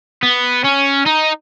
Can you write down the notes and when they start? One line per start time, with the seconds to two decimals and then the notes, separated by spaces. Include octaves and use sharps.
0.23 B3
0.64 C#4
1.06 D#4